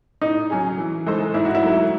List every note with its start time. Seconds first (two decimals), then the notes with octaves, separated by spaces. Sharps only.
0.22 A2 D#4
0.50 F#3 C#4 G#4
0.78 E3
1.07 G#3 D#4 A4 C5
1.34 G#2 E4
1.45 F#4
1.55 E4
1.63 F#3 A3